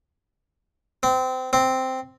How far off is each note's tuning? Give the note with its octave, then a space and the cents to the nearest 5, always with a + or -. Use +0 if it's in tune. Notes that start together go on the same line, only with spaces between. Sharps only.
C4 -25
C4 -5